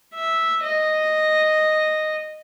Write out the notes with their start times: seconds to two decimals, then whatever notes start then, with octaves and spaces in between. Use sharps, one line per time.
0.14 E5
0.63 D#5